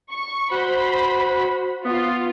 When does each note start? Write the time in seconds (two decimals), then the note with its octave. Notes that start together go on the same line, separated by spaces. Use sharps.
0.10 C#6
0.52 F#4 C5 B5
1.85 B3 F4